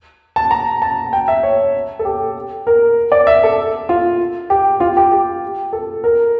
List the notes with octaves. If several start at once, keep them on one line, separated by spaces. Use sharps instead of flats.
A5
A#5
A5
G5
E5
C#5
A4
G4
A#4
D5
E5
A4
F4
G4
F4
G4
G4
A4
A#4